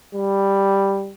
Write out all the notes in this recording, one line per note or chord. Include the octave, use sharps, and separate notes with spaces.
G3